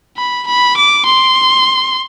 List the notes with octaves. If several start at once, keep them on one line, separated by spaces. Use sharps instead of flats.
B5
B5
D6
C6